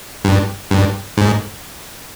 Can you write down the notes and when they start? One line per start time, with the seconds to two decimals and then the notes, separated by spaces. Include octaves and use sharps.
0.24 G2
0.71 G2
1.17 G#2